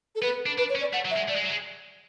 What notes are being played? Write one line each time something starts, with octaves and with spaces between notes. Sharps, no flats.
A4
B3 B4
D4
D4 B4
C#5
C#4
D5
A3 F#5
F#3
E5
G#3
A3 D5
G#3
F#3
G#3